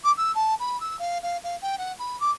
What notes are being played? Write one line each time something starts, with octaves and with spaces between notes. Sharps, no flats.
D6
E6
A5
B5
E6
F5
F5
F5
G5
F#5
B5
D6